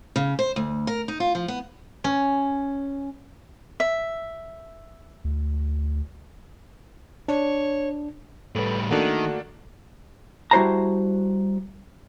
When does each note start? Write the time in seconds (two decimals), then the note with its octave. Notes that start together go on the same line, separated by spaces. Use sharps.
0.16 C#3
0.39 C5
0.56 D2
0.87 A#4
1.08 D#4
1.20 F4
1.35 F3
1.48 B3
2.04 C#4
3.80 E5
5.24 D2
7.28 D4 C#5
8.55 A2 G3 A4 B4
8.91 D#3 A3 A#3 D4 F#4 A4 F#5
10.51 G3 E4 F#4 C5 A5 A#5